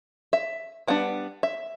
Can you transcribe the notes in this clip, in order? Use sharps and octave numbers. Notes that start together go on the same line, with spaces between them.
E5
G3 B3 D4 F#5
E5